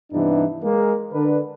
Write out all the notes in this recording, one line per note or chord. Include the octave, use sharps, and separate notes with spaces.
G2 C3 E3 B3 D4 D#4
G#3 A#3
D3 D4 B4